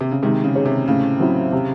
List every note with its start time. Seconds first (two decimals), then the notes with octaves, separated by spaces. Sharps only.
0.01 C3
0.11 C#3
0.23 C3 D#3 G#3
0.44 C#3
0.55 D#4 G#4 C#5
0.66 C3
0.88 A2 C#3
1.20 F#3 C4 E4
1.52 C3